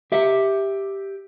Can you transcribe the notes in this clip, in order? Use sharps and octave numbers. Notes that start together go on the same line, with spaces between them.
G4 E5